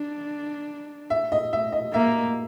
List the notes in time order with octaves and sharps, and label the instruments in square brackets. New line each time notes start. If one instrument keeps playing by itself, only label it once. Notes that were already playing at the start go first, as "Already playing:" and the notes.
Already playing: [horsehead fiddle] D4
[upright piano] E5
D#5
E5
D#5
[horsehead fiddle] A#3 [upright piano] E5